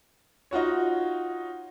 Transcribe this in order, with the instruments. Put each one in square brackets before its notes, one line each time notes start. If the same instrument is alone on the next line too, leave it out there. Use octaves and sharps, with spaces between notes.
[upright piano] D#4 F4 F#4 C#5